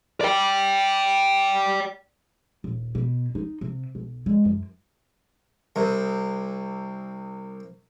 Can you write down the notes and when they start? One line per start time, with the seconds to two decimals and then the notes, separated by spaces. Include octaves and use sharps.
0.21 D5 G5
2.64 D#1
2.95 B2
3.35 D#4
3.61 C3
3.95 B1
4.26 G#3
4.45 F#2
5.76 C2 C3